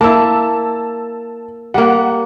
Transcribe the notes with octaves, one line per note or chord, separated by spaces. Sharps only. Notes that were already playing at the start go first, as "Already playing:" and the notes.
A#3 E4 A5 E6
G3 A#3 F#5